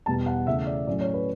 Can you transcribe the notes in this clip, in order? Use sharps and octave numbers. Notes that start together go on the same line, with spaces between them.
E2 B2 G3 B3 A5
F#5
C#3 E3 A3 E5
D5
A2 F#3 A3 C#4 D5
C#5
B4